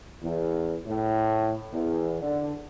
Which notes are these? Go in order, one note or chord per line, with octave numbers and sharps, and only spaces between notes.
E2
A2
E2
D3